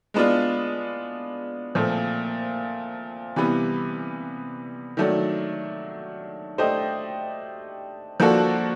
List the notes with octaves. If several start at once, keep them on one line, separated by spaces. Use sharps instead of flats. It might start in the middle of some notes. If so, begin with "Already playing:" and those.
G#3 B3 D4 F4
A#2 F3 A3 C4
C3 E3 G3 B3
D#3 F#3 A3 D4
A3 D4 G4 C5 D#5
F3 A#3 D4 F#4 A4